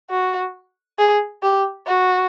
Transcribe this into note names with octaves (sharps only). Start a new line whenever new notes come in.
F#4
G#4
G4
F#4